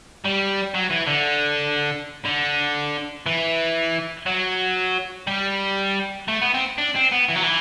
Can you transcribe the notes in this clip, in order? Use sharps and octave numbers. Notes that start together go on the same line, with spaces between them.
G3
F#3
E3
D3
D3
E3
F#3
G3
A3
B3
C4
D4
C4
B3
E3
F#3
E3